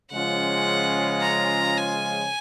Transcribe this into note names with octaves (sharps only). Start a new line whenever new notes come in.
C#3 F3 G#3 C#4 F4 F#5
A#5
G#5